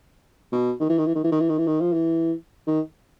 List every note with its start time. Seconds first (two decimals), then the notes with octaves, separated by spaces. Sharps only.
0.52 B2
0.80 D#3
0.89 E3
0.98 D#3
1.06 E3
1.15 D#3
1.24 E3
1.31 D#3
1.40 E3
1.49 D#3
1.58 E3
1.67 D#3
1.80 F3
1.93 E3
2.67 D#3